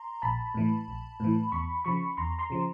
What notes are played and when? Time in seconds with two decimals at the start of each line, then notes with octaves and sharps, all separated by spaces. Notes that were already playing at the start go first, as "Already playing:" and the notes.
Already playing: A#5 C6
0.22 A#1 A5 B5
0.54 A2 E3
0.88 A#1
1.20 A2 E3
1.52 E2 B5 C#6
1.85 C#3 F3 B5 C#6
2.17 E2 A#5 C6
2.39 A#5 C6
2.50 C#3 F3